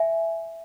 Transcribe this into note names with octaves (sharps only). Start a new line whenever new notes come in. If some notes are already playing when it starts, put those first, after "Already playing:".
Already playing: E5 G#5